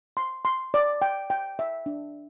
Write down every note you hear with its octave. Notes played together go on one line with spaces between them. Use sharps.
C6
C6
D5
G5
G5
E5
D4